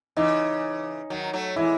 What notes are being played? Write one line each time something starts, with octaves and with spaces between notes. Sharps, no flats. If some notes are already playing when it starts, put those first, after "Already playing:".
C#3 E3 D#4
D#3 F#3
F#3 A3
E3 G#3 E4